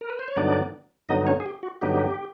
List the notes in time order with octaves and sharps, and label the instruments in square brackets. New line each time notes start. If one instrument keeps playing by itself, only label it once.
[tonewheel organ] A#4
B4
C5
C#5
G2 D3 F#3 B3 D4 D#4 D5
G2 D3 F#3 B3 D#4 D#5
C#4 C#5
G#4
G4
F#4
G2 D3 F#3 B3 D#4 G4